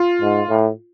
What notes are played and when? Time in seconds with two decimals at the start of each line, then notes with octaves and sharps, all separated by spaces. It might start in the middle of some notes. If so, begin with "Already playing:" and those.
Already playing: F4
0.22 G#2
0.50 A2